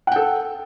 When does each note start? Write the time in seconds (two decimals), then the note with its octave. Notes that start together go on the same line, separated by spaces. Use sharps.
0.07 F#5
0.12 G5
0.16 A4